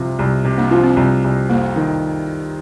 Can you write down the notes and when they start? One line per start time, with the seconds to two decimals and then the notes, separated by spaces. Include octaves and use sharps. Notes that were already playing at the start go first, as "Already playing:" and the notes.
Already playing: C2 C3 F3
0.19 C2
0.45 C3
0.58 A#3 D4
0.71 F3 C4
0.84 C4
0.96 C2
1.24 C2
1.50 F2 A#3
1.76 D#3